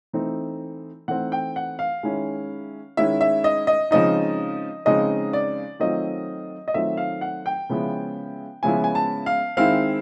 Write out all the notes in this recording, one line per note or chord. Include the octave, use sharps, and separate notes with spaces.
E3 A3 C4 D#4
E3 A3 C4 D#4 F#5
G5
F#5
F5
D#3 G#3 C#4 E4
D#3 G#3 C#4 E4 E5
E5
D#5
D#5
C#3 F3 G#3 C4 D#4 D#5
C#3 F3 G#3 C4 D#4 D#5
D5
D#3 F#3 A3 C4 F4 D#5
D#5
D#3 F#3 A3 C4 F4 E5
F5
F#5
G5
C#3 F3 G#3 B3 E4
C#3 F3 G#3 B3 E4 G#5
G#5
A5
F5
D#3 G#3 C4 E4 F5